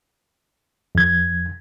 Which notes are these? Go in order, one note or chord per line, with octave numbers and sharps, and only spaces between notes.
F2 G#6